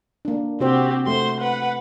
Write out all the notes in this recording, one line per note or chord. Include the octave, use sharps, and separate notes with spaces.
A#3 D4
C3 C4 F#4 G4 C5
A3 F#4 C5 C6
B4 F#5